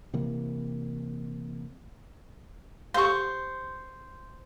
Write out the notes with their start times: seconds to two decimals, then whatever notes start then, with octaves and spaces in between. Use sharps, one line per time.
0.14 C3 E3 A#3
2.94 G4 C5 F5 C6 C#6